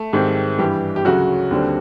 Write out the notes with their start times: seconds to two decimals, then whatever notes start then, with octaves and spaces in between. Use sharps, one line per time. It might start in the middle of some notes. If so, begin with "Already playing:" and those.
Already playing: A3
0.13 G#2 D#3 G3 C4
0.59 G2 E3 G3 G4
0.96 G4
1.05 D2 C#3 F#3 F#4
1.51 D#2 D3 G3 C4